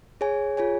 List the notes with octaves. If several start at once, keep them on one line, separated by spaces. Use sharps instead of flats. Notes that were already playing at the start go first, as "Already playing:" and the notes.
G#4 C#5 G#5
F4 G#4 C#5 G#5